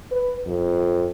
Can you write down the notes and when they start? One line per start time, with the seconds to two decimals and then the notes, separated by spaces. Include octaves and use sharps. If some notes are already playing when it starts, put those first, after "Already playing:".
0.12 B4
0.47 F2